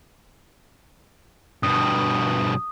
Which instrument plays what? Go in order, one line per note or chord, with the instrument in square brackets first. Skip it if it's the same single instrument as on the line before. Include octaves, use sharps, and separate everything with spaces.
[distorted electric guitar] G2 B2 [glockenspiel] D#6